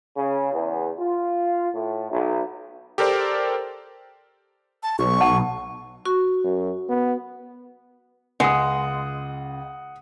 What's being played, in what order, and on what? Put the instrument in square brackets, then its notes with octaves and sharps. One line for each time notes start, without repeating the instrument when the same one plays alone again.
[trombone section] C#3
E2
F4
A2
B1
[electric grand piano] G4 A4 A#4 C5 D5
[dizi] A5
[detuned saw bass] B1 [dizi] C#6
[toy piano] F#5 A5
[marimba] F#4 C#6
[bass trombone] F#2
B3
[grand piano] C#2 [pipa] G#3 [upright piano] F#5 D#6